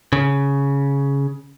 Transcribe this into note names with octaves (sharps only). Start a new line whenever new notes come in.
C#3